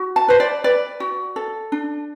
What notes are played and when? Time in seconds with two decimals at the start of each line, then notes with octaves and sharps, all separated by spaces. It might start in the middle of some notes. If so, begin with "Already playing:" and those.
Already playing: F#4
0.16 A5
0.28 B4 C5
0.40 D5
0.64 B4 D5
1.00 F#4
1.36 A4
1.72 D4